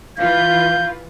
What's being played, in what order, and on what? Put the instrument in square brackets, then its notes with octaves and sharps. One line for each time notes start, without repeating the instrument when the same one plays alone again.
[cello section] E3 F4 B4 [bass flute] F5 [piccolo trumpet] G6